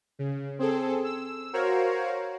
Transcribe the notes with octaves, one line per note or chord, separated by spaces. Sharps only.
C#3
C4 G#4 A4
E6
F#4 A#4 C5 C#5 F5